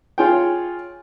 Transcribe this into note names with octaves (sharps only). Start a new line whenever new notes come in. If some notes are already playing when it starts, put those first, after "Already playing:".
F4 G#4 C#5 G5